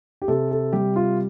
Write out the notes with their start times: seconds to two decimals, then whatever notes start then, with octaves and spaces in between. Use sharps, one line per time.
0.22 G4
0.28 C3 A4
0.51 A4
0.73 G3 G4
0.96 F4